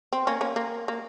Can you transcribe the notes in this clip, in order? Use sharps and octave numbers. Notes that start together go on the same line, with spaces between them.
C4
A#3 C#4
A#3 C#4
A#3
A#3